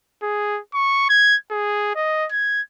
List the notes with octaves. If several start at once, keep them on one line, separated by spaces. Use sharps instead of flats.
G#4
C#6
G#6
G#4
D#5
G#6